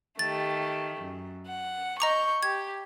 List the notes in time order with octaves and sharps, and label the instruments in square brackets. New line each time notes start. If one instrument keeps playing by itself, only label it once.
[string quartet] D#3 A3 G4 [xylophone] A6
[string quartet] F#2
F#5
[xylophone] D#5 A#5 D6 [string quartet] C#6 G6
[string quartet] G4 [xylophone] G#6